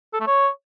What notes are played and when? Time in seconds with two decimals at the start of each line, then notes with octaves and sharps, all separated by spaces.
0.13 A4
0.20 A3
0.27 C#5